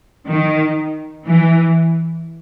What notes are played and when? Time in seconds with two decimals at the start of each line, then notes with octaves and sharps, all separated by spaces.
0.28 D#3
1.27 E3